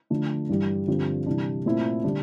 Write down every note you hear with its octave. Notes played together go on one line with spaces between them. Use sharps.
D3 F3 A3 D4
G2 E3 G3
G2 D3 F3 C4 G4
C3 E3 G3 D4
A#2 A3 C4 E4
D3 G3 D4